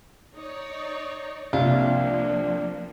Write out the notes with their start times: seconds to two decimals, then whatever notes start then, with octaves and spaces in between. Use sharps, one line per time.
0.35 D#4 C#5 D5
1.53 C2 C3 F3 A#3 D4 F4